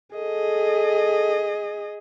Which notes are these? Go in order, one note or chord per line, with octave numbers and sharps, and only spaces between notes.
G#4 A4 D#5